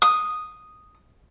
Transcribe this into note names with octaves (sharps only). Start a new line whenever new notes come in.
D#6